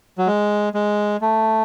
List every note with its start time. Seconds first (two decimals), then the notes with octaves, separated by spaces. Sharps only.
0.18 F#3
0.27 G#3
0.74 G#3
1.21 A3